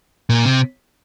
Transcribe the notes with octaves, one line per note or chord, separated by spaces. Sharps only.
A#2
C3